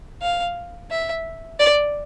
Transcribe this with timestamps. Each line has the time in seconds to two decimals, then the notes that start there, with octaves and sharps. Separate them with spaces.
0.22 F5
0.91 E5
1.59 D5